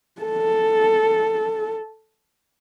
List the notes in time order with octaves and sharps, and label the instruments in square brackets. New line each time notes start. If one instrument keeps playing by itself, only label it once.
[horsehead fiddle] A4